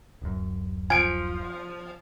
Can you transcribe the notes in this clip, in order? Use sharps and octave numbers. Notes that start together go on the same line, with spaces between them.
D1 F#2
F3 G#5 D7